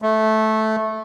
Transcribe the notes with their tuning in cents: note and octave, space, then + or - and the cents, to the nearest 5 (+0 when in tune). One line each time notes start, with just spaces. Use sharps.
A3 -10